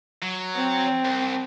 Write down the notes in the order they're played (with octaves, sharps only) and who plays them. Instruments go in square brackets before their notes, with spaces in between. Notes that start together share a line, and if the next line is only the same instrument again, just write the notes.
[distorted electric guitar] F#3
[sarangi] C4
[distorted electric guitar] C2